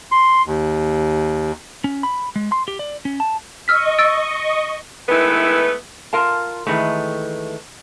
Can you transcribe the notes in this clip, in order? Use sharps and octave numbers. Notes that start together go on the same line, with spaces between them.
C6
D#2
C#4
B5
G#3
C6
G4
D5
C#4
A5
D#5 C#6 E6 F6 B6
E6 A6 D7
D#3 G#3 A3 B3 E4 B4
F4 A#4 F5 A5
D#3 E3 G#3 A3